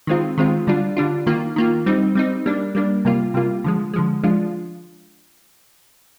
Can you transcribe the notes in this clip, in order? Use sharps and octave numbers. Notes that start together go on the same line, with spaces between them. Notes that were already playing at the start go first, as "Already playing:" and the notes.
D#3 G#3 C4 F4
D#3 G#3 C4 F4
D3 G3 D4 F4
D3 G3 D4 F4
D#3 A#3 F4
D#3 A#3 F4
G3 C4 D#4
G3 C4 D#4
G3 A#3 D4
G3 A#3 D4
C3 G3 A#3 F4
C3 G3 A#3 F4
D3 F3 G#3
D3 F3 G#3
F3 G#3 D4 F4